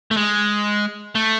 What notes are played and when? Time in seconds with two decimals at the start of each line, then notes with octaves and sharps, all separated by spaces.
0.11 A3
0.17 G#3
1.15 A3